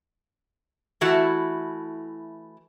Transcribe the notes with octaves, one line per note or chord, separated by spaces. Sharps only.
E3 A3 E4 F#4 A5